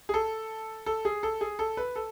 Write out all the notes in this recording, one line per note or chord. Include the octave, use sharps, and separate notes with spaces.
G#4
A4
A4
G#4
A4
G#4
A4
B4
A4